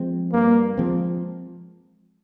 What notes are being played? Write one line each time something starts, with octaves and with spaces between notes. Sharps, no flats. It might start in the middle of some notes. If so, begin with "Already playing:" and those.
Already playing: F3 G#3 C4
G2 A#3
F3 G#3 C4